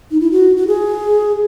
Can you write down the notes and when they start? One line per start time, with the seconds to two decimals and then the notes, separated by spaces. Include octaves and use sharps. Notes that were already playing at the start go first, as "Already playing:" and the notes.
0.11 D#4
0.20 E4
0.32 F#4
0.56 F#4
0.67 G#4